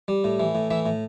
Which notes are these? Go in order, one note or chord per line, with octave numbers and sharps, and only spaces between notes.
G3
A2
E3
A2
E3 E5
A2